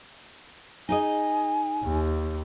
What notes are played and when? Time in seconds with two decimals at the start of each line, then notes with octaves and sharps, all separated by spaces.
0.89 D#4 G#4 D#5 G#5
1.84 D#2